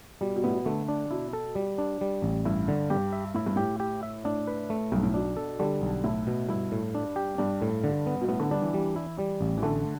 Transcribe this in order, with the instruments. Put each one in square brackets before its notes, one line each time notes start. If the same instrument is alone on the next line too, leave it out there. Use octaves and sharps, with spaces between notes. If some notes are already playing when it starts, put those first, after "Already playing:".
[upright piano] B2 [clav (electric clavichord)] G3
[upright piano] B2
[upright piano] A2 [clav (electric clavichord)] B3
[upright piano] B2
[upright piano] D3 [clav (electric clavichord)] A3
[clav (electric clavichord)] D4
[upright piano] B2 [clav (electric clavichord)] E4
[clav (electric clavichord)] A4
G3
D4
G3
A1
[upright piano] G2 [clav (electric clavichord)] E4
[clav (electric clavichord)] D3
[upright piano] G2 [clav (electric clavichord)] G4
[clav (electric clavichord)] E5
[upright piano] A2 [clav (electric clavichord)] E4
[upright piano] G2
[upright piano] A2 [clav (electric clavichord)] G4
[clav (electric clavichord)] G4
E5
[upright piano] A2 [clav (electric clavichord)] D4
[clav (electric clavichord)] B4
A3
[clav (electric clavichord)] B1 [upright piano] G2
[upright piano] A2
[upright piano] B2 [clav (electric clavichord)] D4
[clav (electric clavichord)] A4
[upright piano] D3 [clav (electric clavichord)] G3
[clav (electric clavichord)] B1
[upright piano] A2 [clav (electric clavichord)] E4
[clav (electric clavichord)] B2
[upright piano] G2 [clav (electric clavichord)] E4
[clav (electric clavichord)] A2
D4
G4
[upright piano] G2 [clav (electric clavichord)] D4
[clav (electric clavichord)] A2
D3
B3
[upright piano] B2
[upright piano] A2 [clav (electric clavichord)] B3
[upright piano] D3
[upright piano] G3 [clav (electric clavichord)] D4
[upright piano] E3
[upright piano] E3 [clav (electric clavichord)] G3
[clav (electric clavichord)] E4
G3
A1
[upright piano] E3
[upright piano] D3 [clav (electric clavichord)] A3